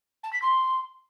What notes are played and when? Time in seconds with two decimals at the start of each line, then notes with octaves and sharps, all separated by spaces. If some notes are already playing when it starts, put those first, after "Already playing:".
0.23 A5
0.33 B6
0.42 C6